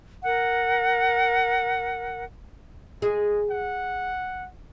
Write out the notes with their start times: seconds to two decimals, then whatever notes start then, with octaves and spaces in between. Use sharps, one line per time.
0.24 A#4 F#5
3.02 G#3 G#4
3.50 F#5